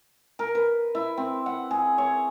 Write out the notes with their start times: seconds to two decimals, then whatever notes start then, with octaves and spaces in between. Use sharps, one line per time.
0.39 A#4
0.55 B4
0.95 E4
1.17 C4
1.46 F#5
1.71 G#4
1.98 C#5